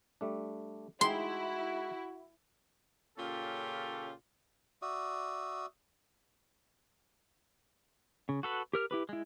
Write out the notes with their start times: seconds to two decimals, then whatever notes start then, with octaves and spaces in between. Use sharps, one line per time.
0.21 G3 A3 D4
1.01 G#3 D#4 E4 F#4 C6
3.17 A#2 C#3 C#4 F4 G4 A4
4.82 F#4 D5 E5 D#6
8.29 C#3
8.43 F#4 A4 B4
8.73 G4 A#4 F6
8.91 E4 G4 B4
9.09 G#3 E4